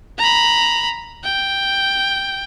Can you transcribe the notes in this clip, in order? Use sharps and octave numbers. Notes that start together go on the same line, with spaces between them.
A#5 B5
G5